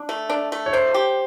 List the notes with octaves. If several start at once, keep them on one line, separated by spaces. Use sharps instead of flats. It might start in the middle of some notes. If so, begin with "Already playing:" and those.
Already playing: D4
A3
D4
A3
C#5
D4 C5
G4